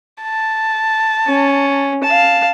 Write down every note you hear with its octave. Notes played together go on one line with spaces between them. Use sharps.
A5
C#4
F5 A5